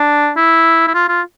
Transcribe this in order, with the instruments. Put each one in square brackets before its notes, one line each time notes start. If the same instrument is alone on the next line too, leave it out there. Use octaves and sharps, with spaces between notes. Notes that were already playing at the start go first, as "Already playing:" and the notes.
Already playing: [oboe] D4
E4
E4
F4
F4